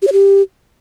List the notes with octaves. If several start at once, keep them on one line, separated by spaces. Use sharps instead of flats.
G4
C#5
G4